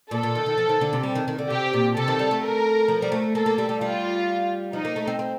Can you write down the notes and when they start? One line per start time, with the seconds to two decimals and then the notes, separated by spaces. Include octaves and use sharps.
0.11 A#2 A4
0.23 A#2
0.35 D#3
0.46 D#3
0.58 F3
0.69 D#3
0.81 D3
0.93 C3
1.03 G3
1.15 D#3
1.28 D#3
1.38 D3
1.50 C3 G4
1.73 A#2
1.96 C3 A4
2.08 D#3
2.19 G3
2.31 A3
2.42 A#4
2.88 F3
3.02 G3
3.12 A3
3.35 A#3 A4
3.46 A#3
3.58 G3
3.69 G3
3.81 G3 F4
4.73 F3 D#4
4.85 A#3
4.96 A3
5.07 C4
5.19 C4